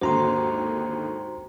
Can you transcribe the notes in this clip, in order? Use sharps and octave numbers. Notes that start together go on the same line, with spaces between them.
G#1 D#2 D3 F#4 C5 A#5 C6